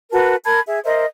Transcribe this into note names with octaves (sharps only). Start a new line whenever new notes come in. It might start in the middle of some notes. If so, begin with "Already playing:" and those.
F#4 A#4 B4 A5
A#4 A5 B5 G#6
G#4 E5
A#4 C5 D#5 E5